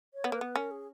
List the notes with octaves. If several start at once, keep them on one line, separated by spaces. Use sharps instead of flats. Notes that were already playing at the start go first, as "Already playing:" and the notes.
C#5
B3
A#3 B4
B3
C#4 A#4
G#4